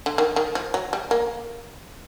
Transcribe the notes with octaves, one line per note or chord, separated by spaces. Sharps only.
D3
D#3
D#3
F3
F#3
G3
A#3